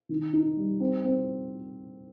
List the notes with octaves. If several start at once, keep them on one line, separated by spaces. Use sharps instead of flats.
D#3
D#4
G3
C4
C4